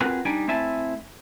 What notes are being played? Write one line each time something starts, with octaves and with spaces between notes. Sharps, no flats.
C4 F4 F#4 G#4 A#4 B4
G3 D4 D#4 G5 G#5
A3 C4 E4 E5 G#5 A5